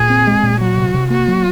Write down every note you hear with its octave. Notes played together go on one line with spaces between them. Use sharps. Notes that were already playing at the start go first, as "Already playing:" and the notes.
Already playing: A#2 G#4
C4
G#3
A#2
F#3 F#4
C3
C3
A#3 F#4
F#3